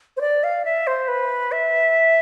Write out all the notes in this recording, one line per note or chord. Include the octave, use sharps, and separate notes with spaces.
C5
D5
F5
E5
C5
B4
E5